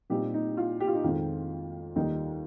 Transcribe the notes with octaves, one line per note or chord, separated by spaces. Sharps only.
A#2 G3 C4 D#4 G4
D#4
F4
G4
F4
D#4 G4
F2 D#3 G#3 C4 F4
D#2 D#3 G3 A#3 D#4